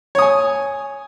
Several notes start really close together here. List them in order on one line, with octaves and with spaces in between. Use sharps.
C#5 D#6 G#5